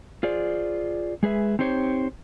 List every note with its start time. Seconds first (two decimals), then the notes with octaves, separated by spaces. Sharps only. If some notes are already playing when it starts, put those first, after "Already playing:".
0.23 F4 G#4 C5 D5
1.23 G#3 G#4 B4 E5
1.59 C4 D#4 G4 C5 C#5